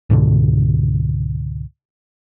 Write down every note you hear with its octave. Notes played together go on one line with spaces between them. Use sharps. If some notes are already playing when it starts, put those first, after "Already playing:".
C#2 G#2 B2 D3